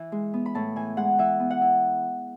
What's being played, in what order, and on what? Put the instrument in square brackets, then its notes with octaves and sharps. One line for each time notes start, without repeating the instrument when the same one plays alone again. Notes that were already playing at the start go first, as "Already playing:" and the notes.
Already playing: [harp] E3
G#3
B3
B5
A2 A5
E3 G#5
G#3 F#5
E3 E5
B3
F#5
E4